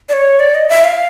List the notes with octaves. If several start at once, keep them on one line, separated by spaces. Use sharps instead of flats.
D5
C#5
D5
D#5
E5
F5